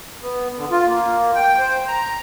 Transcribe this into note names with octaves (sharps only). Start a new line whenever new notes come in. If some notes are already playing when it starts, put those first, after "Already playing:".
B3
D3
F4
A#3
G5
C5
A#5